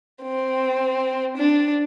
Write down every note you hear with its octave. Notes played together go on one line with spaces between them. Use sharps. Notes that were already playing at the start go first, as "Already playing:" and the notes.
C4
D4